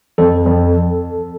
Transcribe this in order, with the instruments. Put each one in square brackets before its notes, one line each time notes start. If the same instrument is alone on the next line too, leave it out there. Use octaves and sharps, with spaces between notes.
[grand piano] F2 [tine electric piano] A4
[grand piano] F2